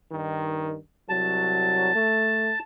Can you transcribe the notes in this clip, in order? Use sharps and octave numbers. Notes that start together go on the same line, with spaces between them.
G2 D#3
C2 F#3 A5
A3